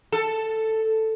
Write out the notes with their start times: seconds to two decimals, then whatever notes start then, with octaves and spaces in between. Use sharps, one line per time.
0.12 A4